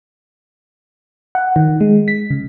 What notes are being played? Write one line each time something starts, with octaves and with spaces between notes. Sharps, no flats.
F#5
D#3
G#3
B6
C#3